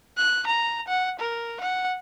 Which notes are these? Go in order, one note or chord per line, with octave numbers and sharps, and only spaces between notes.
F#6
A#5
F#5
A#4
F#5